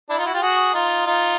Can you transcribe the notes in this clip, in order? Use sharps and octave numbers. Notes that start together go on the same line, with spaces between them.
D4 E4
D#4 F4
E4 F#4
F4 G4
F#4 G#4
D#4 F4
D#4 F4